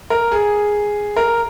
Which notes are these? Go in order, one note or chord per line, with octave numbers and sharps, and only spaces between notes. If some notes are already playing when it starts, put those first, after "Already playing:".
A#4
G#4
A#4